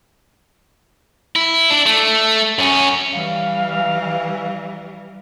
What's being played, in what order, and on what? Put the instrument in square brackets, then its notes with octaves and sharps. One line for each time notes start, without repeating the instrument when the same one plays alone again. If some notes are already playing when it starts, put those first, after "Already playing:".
[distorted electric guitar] E4
D4
A3
F#2 C#4
[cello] E3 G3 [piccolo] F5